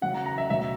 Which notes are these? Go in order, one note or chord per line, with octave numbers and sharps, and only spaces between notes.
C#3 F#3 F#5
A#5
A#5
E5
B2 F#3 E5